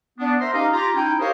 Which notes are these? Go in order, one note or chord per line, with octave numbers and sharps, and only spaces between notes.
B3 D4
A#4 C5 E5 A#5 C6
C#4 D#4 G4 D#5 F5
F4 G4 A#5
C#4 D#4 E4 G5
G4 A#4 C5 C#5 D#5 F5